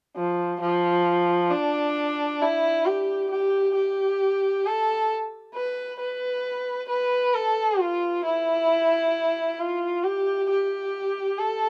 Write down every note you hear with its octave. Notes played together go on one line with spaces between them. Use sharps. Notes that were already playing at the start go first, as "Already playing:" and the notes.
F3
F3
D4
E4
G4
G4
G4
A4
B4
B4
B4
A4
F4
E4
F4
G4
G4
A4